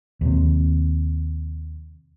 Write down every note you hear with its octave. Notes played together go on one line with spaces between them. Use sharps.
D#2 C3